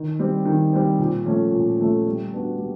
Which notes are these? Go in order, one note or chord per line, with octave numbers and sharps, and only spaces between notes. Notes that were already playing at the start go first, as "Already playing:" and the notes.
Already playing: D#3
G3 C4
D#3
G3 C4
A#2
F3 A3 C#4
A#2
F3 A3 C#4
G3
B3 D4 F#4
G3